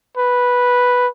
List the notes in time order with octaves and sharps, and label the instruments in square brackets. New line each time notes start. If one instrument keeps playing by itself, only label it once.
[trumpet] B4